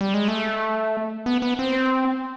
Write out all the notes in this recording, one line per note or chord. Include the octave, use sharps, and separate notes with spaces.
G3
G#3
A3
B3
B3
C4